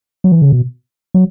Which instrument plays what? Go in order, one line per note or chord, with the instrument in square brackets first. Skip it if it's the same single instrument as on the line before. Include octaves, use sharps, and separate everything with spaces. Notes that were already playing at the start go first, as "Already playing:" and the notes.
[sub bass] F#3
E3
C#3
B2
F#3